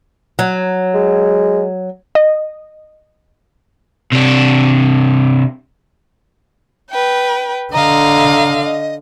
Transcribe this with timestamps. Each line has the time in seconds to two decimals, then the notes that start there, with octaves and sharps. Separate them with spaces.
0.39 F#3
0.94 G#3
2.15 D#5
4.13 C3 D4
6.91 B4 G5
7.73 D3 D#5 F5 A#5
8.65 D#5